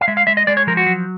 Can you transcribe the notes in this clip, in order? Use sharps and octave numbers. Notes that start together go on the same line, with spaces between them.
F5
G#3 E5
F5
G#3 E5
D#5
G#3 D5
C#5
F3 A#4
F#4
F#3